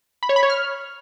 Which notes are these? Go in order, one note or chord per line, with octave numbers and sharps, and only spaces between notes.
B5
C#5
B5
C#5
F6